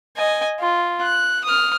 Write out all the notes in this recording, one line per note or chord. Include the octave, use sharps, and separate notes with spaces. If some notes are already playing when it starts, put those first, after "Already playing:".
D#5 G#5
F4
F#6
D#6 F6